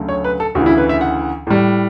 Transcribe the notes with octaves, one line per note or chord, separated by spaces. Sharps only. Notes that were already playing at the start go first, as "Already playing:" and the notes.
Already playing: D2 C#3 F#3 A3
C#5
B4
A4
D2 C#3 E3 F#4
E4
B4
E5
F#5
A2 G3